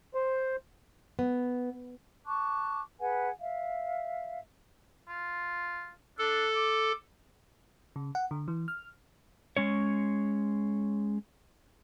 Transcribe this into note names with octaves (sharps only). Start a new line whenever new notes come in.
C5
B3
A5 C#6 D6 F#6
G#4 B4 F#5 G#5
E5 F5
F4
D4 A4
D6
C#3
F#5
D3
E3
F6
G#3 C#4 C#5